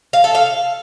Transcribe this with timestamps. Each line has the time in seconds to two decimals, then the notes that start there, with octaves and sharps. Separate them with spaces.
0.13 F5
0.24 A4
0.35 F5